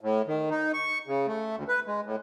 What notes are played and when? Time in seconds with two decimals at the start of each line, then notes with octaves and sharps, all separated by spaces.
0.01 A2
0.27 D#3
0.50 D#4
0.74 C#6
1.07 C#3
1.27 A3
1.56 D2
1.68 B4
1.87 G#3
2.06 A2